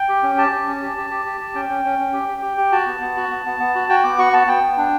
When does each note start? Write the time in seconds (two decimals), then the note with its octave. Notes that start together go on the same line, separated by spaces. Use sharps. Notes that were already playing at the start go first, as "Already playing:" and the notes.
Already playing: G5
0.09 G4
0.23 C#4
0.38 G4 A5
0.52 G4
0.67 C#4
0.82 G4
0.97 G4
1.10 G4
1.25 G4
1.41 G4
1.55 C#4 G5
1.69 C#4
1.85 C#4
1.99 C#4
2.13 G4
2.28 G4
2.42 G4
2.57 G4
2.72 F#4 A5
2.86 B3
3.01 B3
3.17 F#4
3.31 B3
3.46 B3
3.59 B3
3.75 F#4
3.89 F#4 G5
4.04 B3 D6
4.18 F#4 C#6
4.33 B3 A5
4.47 B3 G5
4.63 B3
4.78 D4